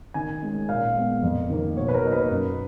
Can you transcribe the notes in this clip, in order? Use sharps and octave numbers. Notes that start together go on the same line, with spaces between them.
D#3 G#5
G#3 C#4
A#2 F5
G#3 B3
F2
D#3 A#3
B2 C#5
B4
A#4
F#3 A#3 D#4
B4
F#2